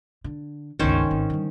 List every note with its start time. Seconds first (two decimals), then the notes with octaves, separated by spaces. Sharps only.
0.24 D3
0.79 G1 C#2 D#3 C#4 C5
1.11 G#1
1.30 D3 G3